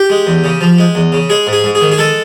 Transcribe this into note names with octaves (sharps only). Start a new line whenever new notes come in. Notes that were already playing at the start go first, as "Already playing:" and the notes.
Already playing: G4
G#3
E2
C#3
F3
G#3
E2
C#3
G#3 G#4
G#2
G#4
G#2
G#4
D#3
G#4
G#3 A4